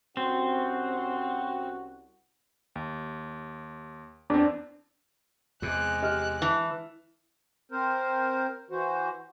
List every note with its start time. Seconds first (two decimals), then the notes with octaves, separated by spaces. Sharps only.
0.17 C2 C4 C#4 F#4
2.76 D#2
4.30 E2 C4 D4
5.62 E2 C3 G#3 F#6
6.02 G4 D#5 F6
6.42 E3 A5
7.72 C4 A#4 C5
8.71 E3 F#4 C5